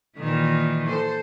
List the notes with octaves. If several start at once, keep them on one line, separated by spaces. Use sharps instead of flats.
A#2 D#3 E3
A4 C5